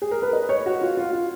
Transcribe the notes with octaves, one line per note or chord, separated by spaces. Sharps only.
G#4
A#4
B4
D#5
C#5
F#4
F4
F4
F4